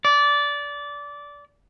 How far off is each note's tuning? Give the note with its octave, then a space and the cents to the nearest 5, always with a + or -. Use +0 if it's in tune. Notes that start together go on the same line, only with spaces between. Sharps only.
D5 -20